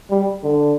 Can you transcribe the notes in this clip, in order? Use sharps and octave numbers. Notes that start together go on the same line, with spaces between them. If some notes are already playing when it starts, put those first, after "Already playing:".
G3
D3